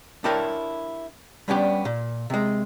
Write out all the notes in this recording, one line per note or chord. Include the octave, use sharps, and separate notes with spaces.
D4 E4 G4 A4 A#4 C#5
G3 B3 C#4 D4 G4
A#2
C3 G#3